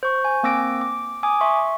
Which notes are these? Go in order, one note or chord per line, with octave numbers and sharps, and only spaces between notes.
C5 C#6
G#5
A#3 C4 D6 E6 A#6 D7
D6
G#5 D6 D#6
E5 C6 C#6